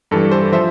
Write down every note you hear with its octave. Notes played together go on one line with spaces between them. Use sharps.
G2 E3 G3 A4
A4 C5
F3 C5 E5